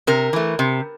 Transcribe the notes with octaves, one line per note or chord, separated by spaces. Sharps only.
C3 A#4
E3 A3
C3